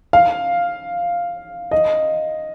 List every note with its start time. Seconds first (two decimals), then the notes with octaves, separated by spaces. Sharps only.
0.13 F5
1.71 D#5